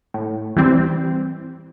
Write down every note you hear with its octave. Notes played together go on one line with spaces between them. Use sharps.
A2
E3 G3 C4